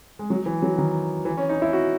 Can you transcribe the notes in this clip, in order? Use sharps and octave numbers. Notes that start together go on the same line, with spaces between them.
G#3
F#3
E3
F#3
D#3
E3
C#4
D#4
E4
F#4